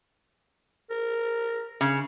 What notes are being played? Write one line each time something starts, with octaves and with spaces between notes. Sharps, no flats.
A#4
C#3